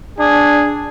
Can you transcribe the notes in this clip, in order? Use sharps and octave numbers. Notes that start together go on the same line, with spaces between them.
D4 G#4